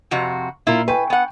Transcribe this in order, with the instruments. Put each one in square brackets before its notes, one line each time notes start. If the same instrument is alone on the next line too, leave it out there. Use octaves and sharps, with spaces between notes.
[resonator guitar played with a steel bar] F2 C3 F#4
[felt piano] A#2 [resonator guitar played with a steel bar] E4 F4 A#4
[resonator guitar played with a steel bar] B4 [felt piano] G5 G#5 C#6
[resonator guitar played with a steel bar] B3 F#5